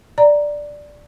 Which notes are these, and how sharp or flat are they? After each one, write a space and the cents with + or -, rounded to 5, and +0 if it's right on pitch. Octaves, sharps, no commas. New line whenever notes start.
D5 +0 A#5 +0